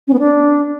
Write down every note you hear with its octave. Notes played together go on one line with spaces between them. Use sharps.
C#4
B3
D4